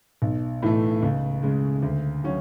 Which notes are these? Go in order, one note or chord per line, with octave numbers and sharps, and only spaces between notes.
B1
A2 E3 A3
C#2
C#3 G#3
D2
C#3 F#3 C#4